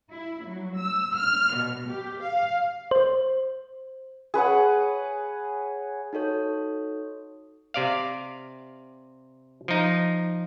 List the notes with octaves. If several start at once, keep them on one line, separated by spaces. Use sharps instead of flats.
E4
F#3
E6
F6
B2
G4
F5
C5
G#4 B4 C#5 F#5
D#4 F#4 A4 C#5
C3 D5 F5
F3 D#4